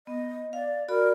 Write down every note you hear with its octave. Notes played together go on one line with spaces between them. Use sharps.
B3 D#5
D5 F5
F#4 A#4 D5 B5